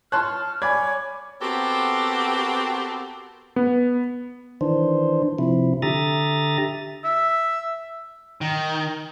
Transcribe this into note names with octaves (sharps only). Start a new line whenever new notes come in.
C#5 A5 C6 F6 F#6
C#5 D5 G#5 B5 D6 G#6
B3 C4 F#4 G4 A4 A#4
B3
D#3 E3 D4 C5
C3 F3 E4
D3 G4 E5 A#5 D#6 A6
E5
D#3